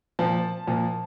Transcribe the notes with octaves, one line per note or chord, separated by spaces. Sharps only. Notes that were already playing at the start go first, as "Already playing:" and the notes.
A#2 F3 A5
A#2 F3